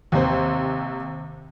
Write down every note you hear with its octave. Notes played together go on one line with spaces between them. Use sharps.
D#2 C3 C5